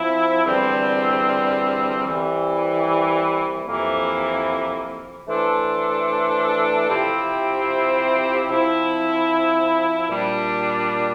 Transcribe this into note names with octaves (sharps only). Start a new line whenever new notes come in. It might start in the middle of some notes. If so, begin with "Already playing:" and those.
Already playing: F3 C4 E4
E2 D3 G3 C4
C2 C3 E3 G3
F2 C3 E3 A#3 E4
E3 A3 D4 A4 C5
C3 F3 C4 E4 G4
F3 C4 E4
A#2 G3 D4